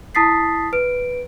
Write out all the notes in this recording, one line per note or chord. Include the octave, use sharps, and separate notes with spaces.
E4 A5 D#6 A6 B6 C7
B4 D7